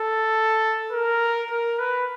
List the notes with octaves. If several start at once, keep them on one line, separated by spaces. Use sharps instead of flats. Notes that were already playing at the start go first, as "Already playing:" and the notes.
Already playing: A4
A#4
A#4
B4